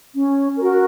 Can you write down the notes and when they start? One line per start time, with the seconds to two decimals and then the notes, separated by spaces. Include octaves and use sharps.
0.14 C#4
0.57 F#4 A#4